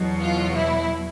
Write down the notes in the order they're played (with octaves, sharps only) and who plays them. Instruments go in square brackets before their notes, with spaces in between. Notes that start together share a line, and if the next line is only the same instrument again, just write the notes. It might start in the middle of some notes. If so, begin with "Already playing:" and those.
Already playing: [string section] E2 B2 F#3
F4
E4